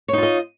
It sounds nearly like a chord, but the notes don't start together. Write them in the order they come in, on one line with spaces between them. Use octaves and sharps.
C#5 D#4 F4 D#5